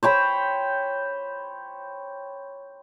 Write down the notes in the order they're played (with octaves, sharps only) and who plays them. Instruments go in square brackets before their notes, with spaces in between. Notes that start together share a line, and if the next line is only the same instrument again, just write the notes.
[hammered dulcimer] C5 C#5 G5 B5